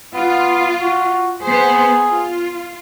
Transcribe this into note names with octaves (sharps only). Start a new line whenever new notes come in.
B3 F4
F#4
B3 G#4 C5
F4